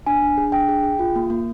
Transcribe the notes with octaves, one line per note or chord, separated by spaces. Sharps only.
D4 G#5
D4
G#4
D4 G5
G#4
G#4
F4
A#3
A#3